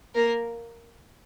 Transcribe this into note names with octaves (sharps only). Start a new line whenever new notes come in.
A#3 A#4